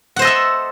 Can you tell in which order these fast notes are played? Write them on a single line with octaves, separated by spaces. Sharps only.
F#5 C5 D#5 A4 E5